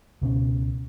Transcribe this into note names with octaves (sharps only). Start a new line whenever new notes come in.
C#2 B2 C#4